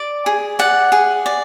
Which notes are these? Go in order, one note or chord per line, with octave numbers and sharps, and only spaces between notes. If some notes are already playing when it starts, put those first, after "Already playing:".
Already playing: D5
G#4
D5 F#5
G#4
D5